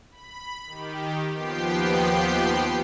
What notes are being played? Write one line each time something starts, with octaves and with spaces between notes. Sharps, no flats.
B5
D#3 G4
D#2 F3 B3 G4 G5 C7